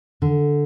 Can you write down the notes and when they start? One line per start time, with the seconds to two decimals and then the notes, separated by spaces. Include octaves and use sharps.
0.22 D3